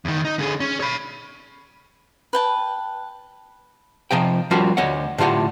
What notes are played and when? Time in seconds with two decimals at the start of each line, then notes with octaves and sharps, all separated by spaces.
0.05 E2 D#3
0.25 D#4
0.39 D3 G#4
0.60 C#4
0.80 C#5 B5
2.33 B4 G5 A5
4.11 C3 F3 D#5 G5
4.51 F3 G3 A#3 C#4 F4 F#4
4.77 D2 C#5 D#5 F#5
5.18 A2 D3 F4 G4 F#5